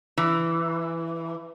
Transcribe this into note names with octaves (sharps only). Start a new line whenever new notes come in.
E3